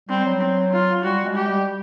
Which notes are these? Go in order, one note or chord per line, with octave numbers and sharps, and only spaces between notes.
G3 C4
F#3
C4
F4
G3 F#4
G#3
G4
G3